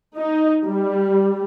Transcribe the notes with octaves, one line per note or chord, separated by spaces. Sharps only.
D#4
G3